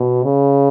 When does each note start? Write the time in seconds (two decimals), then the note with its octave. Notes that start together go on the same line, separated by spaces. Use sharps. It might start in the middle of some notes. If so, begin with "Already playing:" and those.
Already playing: B2
0.23 C#3